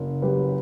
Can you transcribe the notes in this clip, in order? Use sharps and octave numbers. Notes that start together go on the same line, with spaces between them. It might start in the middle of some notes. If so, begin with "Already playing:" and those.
Already playing: F#1
F#3 G4 B4